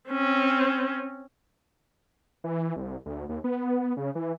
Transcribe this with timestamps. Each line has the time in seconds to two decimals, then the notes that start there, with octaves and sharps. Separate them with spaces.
0.10 C4 C#4
2.44 E3
2.76 C2
3.06 D2
3.29 D#2
3.44 B3
3.97 C#3
4.15 E3